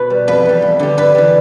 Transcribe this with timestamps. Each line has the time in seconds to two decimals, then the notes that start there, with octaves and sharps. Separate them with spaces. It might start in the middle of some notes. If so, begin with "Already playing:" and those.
Already playing: B2 B4
0.10 G3
0.28 F2 B4
0.45 E3 G3
0.62 F2
0.79 D3 G3
0.97 G2 B4
1.15 E3 G3